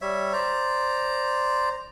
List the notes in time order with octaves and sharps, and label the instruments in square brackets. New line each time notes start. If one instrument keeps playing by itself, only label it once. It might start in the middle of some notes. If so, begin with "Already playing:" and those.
[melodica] G3 C#5 E5
C5 D5 A#5